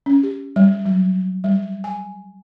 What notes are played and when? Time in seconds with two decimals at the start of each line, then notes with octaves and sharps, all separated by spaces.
0.06 C#4
0.23 G4
0.56 G3
0.85 F#3
1.44 G3
1.84 G#5